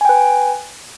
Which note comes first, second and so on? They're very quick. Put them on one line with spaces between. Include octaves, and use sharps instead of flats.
G#5 G5 B4